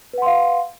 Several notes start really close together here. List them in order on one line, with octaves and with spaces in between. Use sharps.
B4 F#5 C6 F5